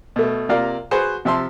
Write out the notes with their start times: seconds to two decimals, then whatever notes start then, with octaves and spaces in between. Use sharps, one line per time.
0.16 B2 A3
0.49 C3 A#3 F4 D5 F5 A#5
0.91 F#4 G#4 B4 C5 F#5
1.25 C3 F3 E5 A5 C6